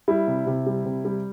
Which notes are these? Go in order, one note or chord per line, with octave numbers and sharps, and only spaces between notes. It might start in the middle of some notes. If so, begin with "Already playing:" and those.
G3 E4
C3
C3
G3
C3
G3